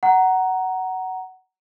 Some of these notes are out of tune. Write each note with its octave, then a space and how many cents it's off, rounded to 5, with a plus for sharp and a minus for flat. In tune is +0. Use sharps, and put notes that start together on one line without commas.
F#5 +15 A#5 +0